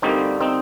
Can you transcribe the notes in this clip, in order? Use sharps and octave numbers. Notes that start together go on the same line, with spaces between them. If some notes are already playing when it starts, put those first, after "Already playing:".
D2 D3 G3 A#3 C4 D#4
C4 D#4